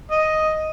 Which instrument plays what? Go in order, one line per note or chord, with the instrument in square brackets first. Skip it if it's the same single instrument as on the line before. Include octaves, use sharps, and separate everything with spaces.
[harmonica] D#5